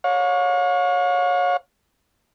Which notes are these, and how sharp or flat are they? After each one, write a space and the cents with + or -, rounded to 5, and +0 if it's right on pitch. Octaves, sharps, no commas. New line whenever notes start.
C#5 +5 F5 +45